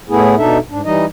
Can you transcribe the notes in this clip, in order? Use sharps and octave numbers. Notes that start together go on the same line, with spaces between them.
A2 A3 B3 E4 G#4
B2 D4 D#4 A4 E5
G#2 D4
E3 G3 D#4 D#5